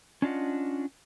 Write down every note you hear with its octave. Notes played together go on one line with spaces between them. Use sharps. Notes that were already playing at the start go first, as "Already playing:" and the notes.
C#4 D4 F4 D#5 F#5